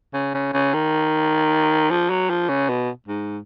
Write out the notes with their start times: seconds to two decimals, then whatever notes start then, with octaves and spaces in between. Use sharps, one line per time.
0.14 C#3
0.34 C#3
0.53 C#3
0.74 D#3
1.91 F3
2.10 F#3
2.30 F3
2.49 C#3
2.69 B2
3.08 G#2